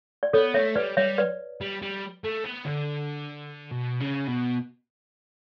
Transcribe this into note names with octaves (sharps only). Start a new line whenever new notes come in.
D5
B3 A4 C#5
A3 C#5 E5
G3 B4 D5
G3 C#5 E5
B4 D5
G3
G3
A3
B3
D3
B2
C#3
B2